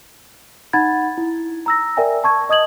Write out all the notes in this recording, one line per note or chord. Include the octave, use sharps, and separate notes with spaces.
D#4 F#5 B5 G#6 A6
E4
A#5 E6 A#6
A#4 D5 E5 G5 G#5
A5 C#6 G#6
D#5 D#6 G#6 F#7